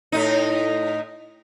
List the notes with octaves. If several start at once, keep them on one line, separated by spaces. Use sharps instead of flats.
A2 D#4